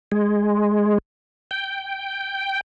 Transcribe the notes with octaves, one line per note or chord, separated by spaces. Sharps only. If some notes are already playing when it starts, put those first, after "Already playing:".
G#3
G5